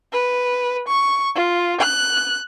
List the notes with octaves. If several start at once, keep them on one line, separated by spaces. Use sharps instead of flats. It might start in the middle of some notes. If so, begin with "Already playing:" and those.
B4
C#6
F4
F#6